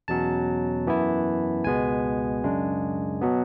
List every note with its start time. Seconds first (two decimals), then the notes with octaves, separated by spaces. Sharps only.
0.08 E2 B2 F#3 C#4 A5
0.86 F#2 E3 B3 E4
1.64 C#2 B2 G#3 B3 G#5
2.43 F#2 C#3 G#3 D4
3.21 B2 F#3 B3